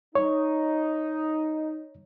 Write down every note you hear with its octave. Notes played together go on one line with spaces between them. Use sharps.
D#4 C#5